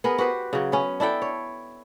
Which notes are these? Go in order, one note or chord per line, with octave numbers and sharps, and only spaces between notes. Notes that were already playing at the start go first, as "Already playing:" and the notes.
B3 G#4 A#4
F#4 G4 B4 C5
C#3 F#3
B3 C#4
D4 E4 A4 G5
C#5